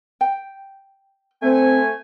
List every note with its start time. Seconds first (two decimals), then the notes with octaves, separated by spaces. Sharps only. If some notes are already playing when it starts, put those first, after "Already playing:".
0.21 G5
1.42 A3 C4 G#5